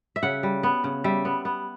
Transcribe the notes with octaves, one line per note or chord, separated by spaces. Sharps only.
E5
C#3 F#5
G3
B3
C#3
G3 E5
B3
B3